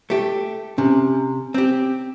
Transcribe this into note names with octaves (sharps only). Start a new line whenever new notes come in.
A3 G4
C3 C#4
C4 G4